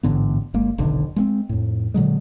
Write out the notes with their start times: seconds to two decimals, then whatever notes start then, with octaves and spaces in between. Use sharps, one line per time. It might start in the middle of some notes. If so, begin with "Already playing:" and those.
0.03 A1 G#2 D3 B3
0.54 G1 G#3 A#3
0.78 F1 B1 D3 D#3
1.16 G#3 A#3 C4
1.49 F2 A2
1.94 A#2 D3 F#3 G#3